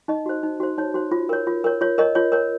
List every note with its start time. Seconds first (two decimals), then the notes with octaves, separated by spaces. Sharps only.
0.08 D#4 D#5
0.26 F#4 C5
0.43 D#4
0.60 F#4 C5
0.78 D#4 C#5
0.94 F#4 C5
1.12 F4
1.29 A#4 C#5
1.47 F4
1.64 A#4 C#5
1.81 F4 C#5
1.98 A#4 C#5 D#5
2.15 F4 C#5
2.32 A#4 C#5